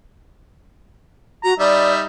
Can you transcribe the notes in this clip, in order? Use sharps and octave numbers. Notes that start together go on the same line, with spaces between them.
F#4 A#5
G3 D#4 D5 E5